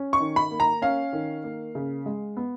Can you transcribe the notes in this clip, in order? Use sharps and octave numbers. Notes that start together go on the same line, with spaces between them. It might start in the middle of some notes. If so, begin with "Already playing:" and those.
Already playing: C#4
C#6
D#3
B5
A#3
A#5
C#4 F5
D#3
A#3
C#3
G#3
B3